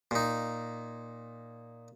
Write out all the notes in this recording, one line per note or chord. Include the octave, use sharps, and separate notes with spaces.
A#2 D#4